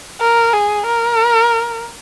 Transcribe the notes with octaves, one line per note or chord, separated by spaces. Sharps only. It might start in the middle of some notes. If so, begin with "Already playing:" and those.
A#4
G#4
A#4